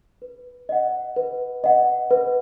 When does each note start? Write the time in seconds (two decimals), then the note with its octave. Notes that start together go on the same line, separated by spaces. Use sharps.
0.22 B4
0.69 D#5 F#5
1.16 B4
1.64 D#5 F#5
2.11 B4